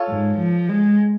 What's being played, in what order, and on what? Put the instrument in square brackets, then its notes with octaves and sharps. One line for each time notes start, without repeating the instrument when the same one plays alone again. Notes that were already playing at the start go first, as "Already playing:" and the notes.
Already playing: [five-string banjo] F4 A4 C#5
[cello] G#2
F3
G#3